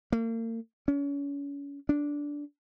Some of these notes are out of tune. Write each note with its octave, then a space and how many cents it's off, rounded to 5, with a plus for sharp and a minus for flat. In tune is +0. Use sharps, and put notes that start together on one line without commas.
A#3 -40
C#4 +35
D4 -10